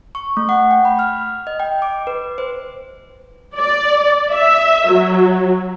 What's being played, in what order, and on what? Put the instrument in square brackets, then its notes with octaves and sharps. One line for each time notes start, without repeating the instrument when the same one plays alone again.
[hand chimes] C#6
A3
F#5
G5
B5
F6
D#5
G5
D6
B4
C5
[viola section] D5
E5
F#3